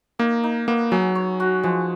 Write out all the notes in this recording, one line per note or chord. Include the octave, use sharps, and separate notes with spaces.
A#3 D#4
D#4
A#3 B3
F#3 G#4
C#5
F#4
F3 G#3